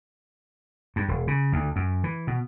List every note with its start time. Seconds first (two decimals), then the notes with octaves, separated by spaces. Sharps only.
0.96 G2
1.08 E1
1.27 C#3
1.52 D2
1.76 F#2
2.04 E3
2.27 B2